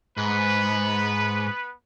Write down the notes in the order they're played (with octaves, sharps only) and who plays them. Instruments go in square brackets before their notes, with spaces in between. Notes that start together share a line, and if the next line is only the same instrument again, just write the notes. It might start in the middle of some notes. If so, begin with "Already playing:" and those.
[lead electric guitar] G#2 [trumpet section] B3 B4